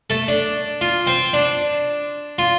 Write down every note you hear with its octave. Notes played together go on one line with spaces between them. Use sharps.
A3 A4
D4
F4
C4 C5
D4
F4